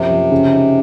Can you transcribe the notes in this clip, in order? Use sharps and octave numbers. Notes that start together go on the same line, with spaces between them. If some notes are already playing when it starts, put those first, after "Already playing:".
Already playing: F#2 C3 F3
F3
C#3
D#4